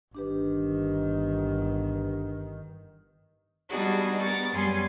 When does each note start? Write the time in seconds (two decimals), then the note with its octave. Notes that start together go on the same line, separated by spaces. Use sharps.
0.15 G1 D#3 D4 G4 B4
3.69 G3 B3 D4 D#4 F#4 G#4
4.21 B3 A#4 C#6 A6
4.52 F#2 G3 B3 G#4 G#5 C6